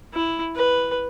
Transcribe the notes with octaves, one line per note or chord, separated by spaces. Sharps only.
E4
B4